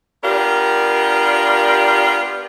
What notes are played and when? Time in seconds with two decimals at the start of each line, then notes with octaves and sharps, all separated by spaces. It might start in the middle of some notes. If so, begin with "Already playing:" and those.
0.23 B3 D4 F4 G4 A#4